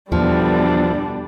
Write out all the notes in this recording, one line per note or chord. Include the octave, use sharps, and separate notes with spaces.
E2 B2 D3 E3 F3 G3 D4